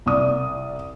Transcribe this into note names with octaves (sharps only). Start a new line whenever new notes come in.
C2 D5 D#6